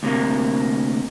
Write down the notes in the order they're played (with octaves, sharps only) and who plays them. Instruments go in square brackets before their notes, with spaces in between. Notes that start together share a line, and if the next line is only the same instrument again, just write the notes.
[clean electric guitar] D2 C3 A#3